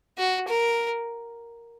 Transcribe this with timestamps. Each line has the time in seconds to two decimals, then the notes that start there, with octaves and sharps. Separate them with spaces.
0.18 F#4
0.48 A#4